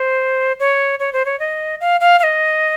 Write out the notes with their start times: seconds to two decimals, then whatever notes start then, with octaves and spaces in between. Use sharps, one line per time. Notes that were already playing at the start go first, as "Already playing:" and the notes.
Already playing: C5
0.60 C#5
1.00 C#5
1.13 C5
1.25 C#5
1.40 D#5
1.80 F5
2.01 F5
2.19 F5
2.23 D#5